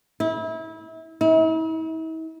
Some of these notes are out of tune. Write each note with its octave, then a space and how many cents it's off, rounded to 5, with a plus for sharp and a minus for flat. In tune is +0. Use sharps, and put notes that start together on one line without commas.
E4 -30
E4 -45